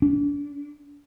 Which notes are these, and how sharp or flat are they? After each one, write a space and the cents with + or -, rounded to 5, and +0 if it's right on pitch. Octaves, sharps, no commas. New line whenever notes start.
D4 -35